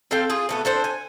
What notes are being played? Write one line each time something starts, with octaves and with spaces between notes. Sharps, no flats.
C4 A4 F5 G5
F4 G#4
B2 A3 B3
D4 A4 C5
G#5